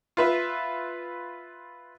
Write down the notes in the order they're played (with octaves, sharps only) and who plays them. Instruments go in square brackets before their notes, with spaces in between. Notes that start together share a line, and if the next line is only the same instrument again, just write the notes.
[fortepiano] F4 B4 E5